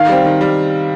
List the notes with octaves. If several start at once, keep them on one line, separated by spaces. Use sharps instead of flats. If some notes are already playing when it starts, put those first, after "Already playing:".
Already playing: D#3 F5
G3 C4
D#3
G3